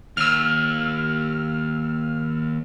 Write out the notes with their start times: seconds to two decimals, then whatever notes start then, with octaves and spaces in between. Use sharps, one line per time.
0.17 D#2 E6 F6